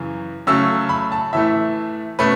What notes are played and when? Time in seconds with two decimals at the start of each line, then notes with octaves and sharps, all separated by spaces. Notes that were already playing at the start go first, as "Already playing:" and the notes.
Already playing: F#2 C#3 E3
0.47 C#3 F#3 A3 C#4 E6
0.89 B5
1.12 A5
1.33 A2 E3 A3 E5
2.19 B2 A3 C#4 B4